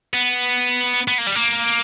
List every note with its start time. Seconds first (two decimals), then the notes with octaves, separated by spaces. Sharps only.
0.14 B3
1.08 B3
1.18 A#3
1.27 G3
1.35 A#3